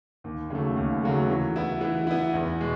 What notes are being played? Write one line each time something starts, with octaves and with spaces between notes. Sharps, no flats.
D#2
C#3 F#3 A3
D#2
C#3 F#3 A3
E3
B3 E4
E3
B3 E4
E2
B2 G#3